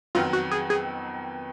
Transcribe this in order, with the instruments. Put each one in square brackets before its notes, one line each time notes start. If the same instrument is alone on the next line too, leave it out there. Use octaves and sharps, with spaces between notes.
[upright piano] F2 D#3 F#3 B3 [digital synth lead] F4
[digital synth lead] F#4
G#4
G#4